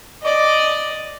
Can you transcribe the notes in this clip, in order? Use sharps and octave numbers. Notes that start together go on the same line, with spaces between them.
D5 D#5